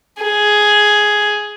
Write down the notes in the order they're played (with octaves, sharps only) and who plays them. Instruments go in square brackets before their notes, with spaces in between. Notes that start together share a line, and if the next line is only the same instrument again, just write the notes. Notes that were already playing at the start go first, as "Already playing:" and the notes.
[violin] G#4